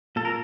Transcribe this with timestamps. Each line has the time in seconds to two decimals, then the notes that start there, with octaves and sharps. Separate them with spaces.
0.16 A#2 A4
0.25 A#4